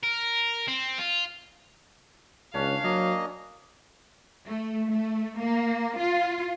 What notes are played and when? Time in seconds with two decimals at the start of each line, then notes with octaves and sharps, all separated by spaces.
0.04 A#4
0.68 C4
0.99 F4
2.54 C#2 C#4 D4 F5
2.84 F#3 A#3 D#5
4.47 A3
4.92 A3
5.40 A#3
5.99 F4